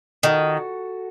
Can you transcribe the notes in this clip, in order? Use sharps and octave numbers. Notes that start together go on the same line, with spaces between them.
D#3 F#4 A4